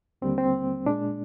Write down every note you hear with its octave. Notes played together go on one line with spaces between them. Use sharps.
D#2 D3 G3 A#3 C4
C4
A#2 G#3 D4